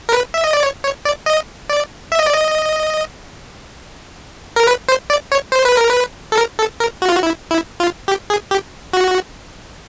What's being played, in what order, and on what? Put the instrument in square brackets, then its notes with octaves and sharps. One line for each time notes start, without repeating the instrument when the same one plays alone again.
[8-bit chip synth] A#4
B4
E5
D#5
D5
C#5
C#5
D5
D#5
D5
E5
D#5
D5
D#5
A#4
B4
C5
D5
C#5
C5
B4
A#4
B4
A4
A#4
A4
A#4
F#4
F4
F#4
E4
E4
F4
G4
G#4
G4
F#4